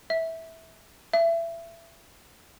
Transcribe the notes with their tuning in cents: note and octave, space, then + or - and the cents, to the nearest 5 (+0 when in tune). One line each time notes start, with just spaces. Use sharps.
E5 -15
E5 +25